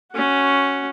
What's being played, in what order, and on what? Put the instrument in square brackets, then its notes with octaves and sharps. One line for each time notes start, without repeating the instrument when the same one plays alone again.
[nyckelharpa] C#4 F#4